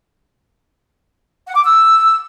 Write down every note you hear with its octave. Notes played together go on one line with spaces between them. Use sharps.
F#5
D6
E6